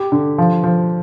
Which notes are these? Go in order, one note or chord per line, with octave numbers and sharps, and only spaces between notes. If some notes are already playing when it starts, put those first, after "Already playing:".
Already playing: G4
D3
F3
F3